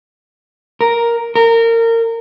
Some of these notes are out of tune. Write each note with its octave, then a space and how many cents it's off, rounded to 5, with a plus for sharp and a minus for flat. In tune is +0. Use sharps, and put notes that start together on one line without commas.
A#4 +5
A#4 -25